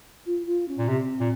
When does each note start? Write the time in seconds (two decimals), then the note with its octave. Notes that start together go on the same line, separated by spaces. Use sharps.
0.26 F4
0.47 F4
0.68 C#4
0.79 A#2
0.88 C3 C4
1.20 A#2